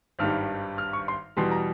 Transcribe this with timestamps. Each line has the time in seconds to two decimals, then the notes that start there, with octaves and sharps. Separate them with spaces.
0.19 G#1 G2 D#3 G3 F6
0.78 F6
0.93 C#6
1.08 C6
1.37 E2 B2 G3 C6
1.51 A#5